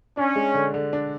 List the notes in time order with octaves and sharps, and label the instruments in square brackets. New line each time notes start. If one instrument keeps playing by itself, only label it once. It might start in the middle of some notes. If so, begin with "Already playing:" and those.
[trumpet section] C#4 [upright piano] D4
[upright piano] G#3
D3
D3
D4